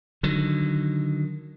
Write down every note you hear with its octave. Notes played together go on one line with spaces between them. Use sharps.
D3 D#3 F#3